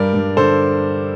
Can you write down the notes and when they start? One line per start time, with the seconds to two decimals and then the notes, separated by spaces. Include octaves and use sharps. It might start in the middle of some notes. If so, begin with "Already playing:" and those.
Already playing: G2 G3 A#4 D5
0.14 G2
0.37 D3 A4 C5